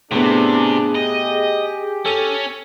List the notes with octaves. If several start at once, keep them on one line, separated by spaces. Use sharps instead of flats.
A2 C3 B3 D4 G#4
G4 D#5
C#4 A4 D#7